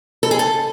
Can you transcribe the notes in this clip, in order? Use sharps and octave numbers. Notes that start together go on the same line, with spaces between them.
A4
G#4
A4